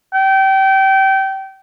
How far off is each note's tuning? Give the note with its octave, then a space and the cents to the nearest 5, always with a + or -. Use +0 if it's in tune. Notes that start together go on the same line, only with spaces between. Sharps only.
G5 -25